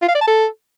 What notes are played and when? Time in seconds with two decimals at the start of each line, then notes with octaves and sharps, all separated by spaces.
0.02 F4
0.08 F5
0.15 D5
0.21 A5
0.28 A4